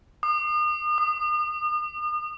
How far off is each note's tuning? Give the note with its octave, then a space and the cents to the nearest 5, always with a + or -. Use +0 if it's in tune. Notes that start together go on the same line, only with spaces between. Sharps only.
D#6 -40
D#6 -25